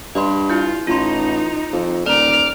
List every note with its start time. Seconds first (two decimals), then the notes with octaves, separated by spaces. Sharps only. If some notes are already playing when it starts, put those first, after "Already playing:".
0.15 G2 D#5 C6
0.50 E4 F4 G6
0.87 A1 D#4 F4 C6
1.73 F2
2.06 D#1 D5 A#5 D6 F6